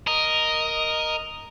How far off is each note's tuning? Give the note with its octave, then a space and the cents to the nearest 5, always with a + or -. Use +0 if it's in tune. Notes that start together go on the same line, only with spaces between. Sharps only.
A#4 +0 D#5 +0